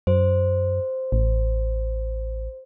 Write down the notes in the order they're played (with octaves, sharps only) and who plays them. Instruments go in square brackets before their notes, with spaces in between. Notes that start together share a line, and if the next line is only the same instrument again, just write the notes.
[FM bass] F#2 [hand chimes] C5
[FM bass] A1